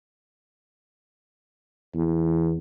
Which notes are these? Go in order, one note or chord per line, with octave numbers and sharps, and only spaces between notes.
E2